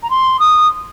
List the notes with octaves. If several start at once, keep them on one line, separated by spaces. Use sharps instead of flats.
A#5
C6
D#6